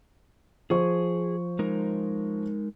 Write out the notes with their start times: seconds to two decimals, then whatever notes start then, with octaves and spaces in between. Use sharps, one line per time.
0.70 F3 G#4 C5 C#6
1.59 G#3 D#4 A#4